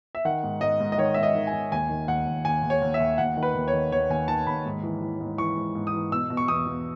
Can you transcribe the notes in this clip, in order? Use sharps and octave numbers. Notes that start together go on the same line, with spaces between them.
E5
D#3 F#5
G#2
G#2 D#5
G#2
D#5
D#3 C#5
G#2 E5
D#5
D#3
G#5
D#3
D#2 G#5
D#3
D#2 F#5
D#2
D#2 G#5
D#2
C#5
D#2
E5
D#2
D#2 F#5
D#3
B4
D#2
C#5
D#3
D#2 C#5
D#2 G#5
D#3 A5
D#2 B5
G#2
E3
E3
G#2
E3 C#6
G#2
G#2
D#6
E3
B2 E6
B2
C#6
E2 D#6
E2